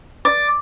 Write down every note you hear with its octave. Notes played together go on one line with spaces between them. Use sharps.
D5